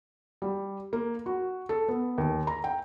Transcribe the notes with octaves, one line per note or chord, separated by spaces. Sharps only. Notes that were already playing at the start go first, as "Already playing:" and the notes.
G3
A#3
F#4
A4
B3
D#2
A#5
G5